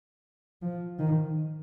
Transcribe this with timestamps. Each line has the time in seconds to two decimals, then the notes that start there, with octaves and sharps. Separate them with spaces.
0.62 F3
0.99 D#3